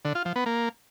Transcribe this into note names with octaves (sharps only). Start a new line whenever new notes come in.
D3
F4
F3
B3
A#3